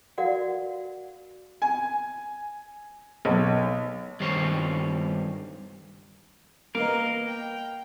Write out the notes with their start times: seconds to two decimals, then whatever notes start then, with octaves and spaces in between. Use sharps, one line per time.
0.18 F#4 A#4 D5 F5 F#5
1.62 G#5
3.25 B1
4.20 G2 D#3 G3 C5 C#5
6.75 A#3 B3 A#4 D#5 F5
7.26 G5